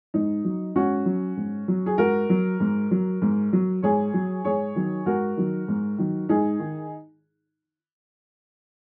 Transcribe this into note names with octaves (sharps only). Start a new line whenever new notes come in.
G#2 D#4
F#3
G#2 C#4 F#4
F#3
G#2
F#3
G#4
G#2 F#4 A#4
F#3
G#2
F#3
G#2
F#3
G#2 G#4 C#5
F#3
G#2 G#4 C#5
D#3 F#3
G#2 F#4 A#4
D#3 F#3
G#2
D#3 F#3
G#2 D#4 G#4
D#3